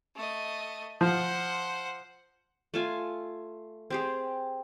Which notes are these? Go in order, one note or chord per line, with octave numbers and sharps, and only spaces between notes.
A3 D#5
F3 C5 F#5
A3 F4 G#5
C4 G4 G#4